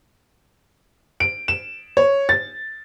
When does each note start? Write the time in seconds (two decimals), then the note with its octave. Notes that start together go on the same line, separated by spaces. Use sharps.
1.20 D7
1.48 E7
1.97 C#5
2.29 A6